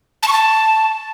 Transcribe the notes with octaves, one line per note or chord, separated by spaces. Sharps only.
A5
C#6
A5